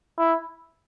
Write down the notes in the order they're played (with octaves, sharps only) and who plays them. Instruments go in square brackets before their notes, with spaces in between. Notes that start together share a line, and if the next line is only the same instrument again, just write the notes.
[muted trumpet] E4